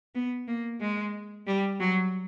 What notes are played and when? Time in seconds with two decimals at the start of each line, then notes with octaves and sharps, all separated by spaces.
0.15 B3
0.48 A#3
0.81 G#3
1.47 G3
1.80 F#3